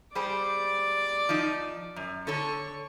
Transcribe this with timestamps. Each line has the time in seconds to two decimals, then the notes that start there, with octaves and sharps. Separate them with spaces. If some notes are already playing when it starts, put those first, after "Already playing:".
0.15 G3 G#4 C5 D5 D6
1.29 F3 D#4
1.96 F#2
2.27 D3 A4 C#5 C#6